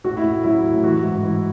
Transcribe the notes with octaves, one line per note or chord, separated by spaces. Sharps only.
A2 F#4
E4
A2
F#3 E4
A2
E3 F#4
G#2
E3 E4